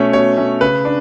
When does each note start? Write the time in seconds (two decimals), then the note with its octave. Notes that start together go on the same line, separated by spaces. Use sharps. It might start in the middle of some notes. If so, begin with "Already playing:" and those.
Already playing: B2 A3 C#4 C#5
0.13 B2 C#5
0.37 A3 C#4
0.61 C#3 B4
0.85 D4